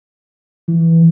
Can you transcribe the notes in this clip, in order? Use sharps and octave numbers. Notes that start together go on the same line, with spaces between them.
E3